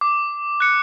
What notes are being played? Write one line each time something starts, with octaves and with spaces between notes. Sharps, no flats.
D6
F#6 C#7